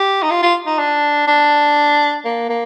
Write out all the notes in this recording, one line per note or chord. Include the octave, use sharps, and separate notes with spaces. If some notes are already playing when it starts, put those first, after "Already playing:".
Already playing: G4
D#4
F4
F4
D#4
D4
D4
A#3
A#3